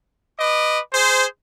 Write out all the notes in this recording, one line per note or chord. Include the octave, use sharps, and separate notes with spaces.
B4 D#5 D6
G#4 C5